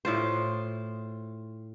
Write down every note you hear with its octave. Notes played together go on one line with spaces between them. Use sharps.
A2 F4 C5